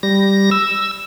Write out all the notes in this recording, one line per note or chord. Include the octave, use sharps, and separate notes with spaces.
G3 A#6
E6